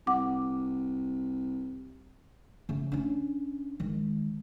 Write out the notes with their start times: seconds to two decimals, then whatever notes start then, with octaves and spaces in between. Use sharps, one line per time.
0.07 C2 F#5 D6
2.69 C#3 A3
2.92 C#4 D4
3.80 D#3 G#3